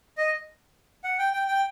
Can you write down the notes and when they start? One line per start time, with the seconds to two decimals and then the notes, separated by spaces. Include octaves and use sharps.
0.18 D#5
1.04 F#5
1.19 G5
1.33 G5
1.48 G5